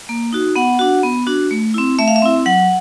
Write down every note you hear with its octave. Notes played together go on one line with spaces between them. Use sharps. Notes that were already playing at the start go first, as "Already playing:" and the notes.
A#3
D#4 F#4
B3 F#5
D4 F#4
B3
D4 F#4
A3
C4 E4
A3 E5
F5
E5
C4 E4
F#3 F#5